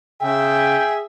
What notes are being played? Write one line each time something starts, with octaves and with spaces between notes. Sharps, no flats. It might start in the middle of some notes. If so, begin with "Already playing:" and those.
C#3 G#4 E5 G5